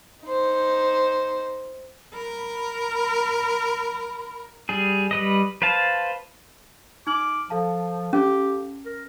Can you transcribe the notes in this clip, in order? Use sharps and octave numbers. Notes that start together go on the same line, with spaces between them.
D#4 C5
A#4 B5
G3 G#4
G3 B4 D#5
B4 C5 F5 A5
D#4 D6 F6 F#7
F3 A4 F5 A5
C#4 G4
A#4